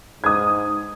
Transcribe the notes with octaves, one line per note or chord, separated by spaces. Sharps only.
G#2 D#6 G#6